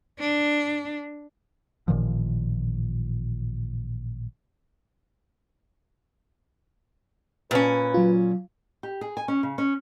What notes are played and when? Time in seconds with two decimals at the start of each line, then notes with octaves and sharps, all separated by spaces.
0.20 D4
1.88 A1 A#2 D#3 F3
7.51 A#2 C#4 B4
7.94 F#3 F4
8.83 G4
9.01 G#4
9.17 G#5
9.28 C#4
9.43 C#3
9.58 C#4